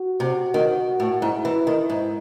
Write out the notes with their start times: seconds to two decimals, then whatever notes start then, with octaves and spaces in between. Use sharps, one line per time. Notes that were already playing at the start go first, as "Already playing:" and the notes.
Already playing: F#4
0.20 C3
0.54 D#3
1.00 A2
1.21 G#2 E4
1.45 E3
1.67 D#3
1.90 G#2